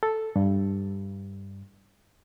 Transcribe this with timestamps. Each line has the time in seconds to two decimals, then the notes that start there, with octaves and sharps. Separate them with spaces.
0.03 A4
0.36 G2